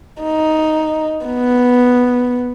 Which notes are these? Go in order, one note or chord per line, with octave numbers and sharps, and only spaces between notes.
D#4
B3